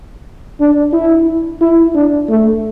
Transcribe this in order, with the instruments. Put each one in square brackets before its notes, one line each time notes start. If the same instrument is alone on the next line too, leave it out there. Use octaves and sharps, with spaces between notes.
[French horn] D4
E4
E4
D4
A3